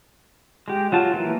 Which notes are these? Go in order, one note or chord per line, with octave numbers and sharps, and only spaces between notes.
G#3 G4
F#3 F4 A5
E3 A#3